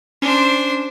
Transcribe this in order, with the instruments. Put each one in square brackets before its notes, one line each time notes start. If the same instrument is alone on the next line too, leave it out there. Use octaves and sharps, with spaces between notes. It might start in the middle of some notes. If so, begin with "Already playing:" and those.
[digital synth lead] C#4 [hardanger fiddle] D4 C5